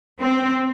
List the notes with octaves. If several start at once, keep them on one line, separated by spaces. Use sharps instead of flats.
C4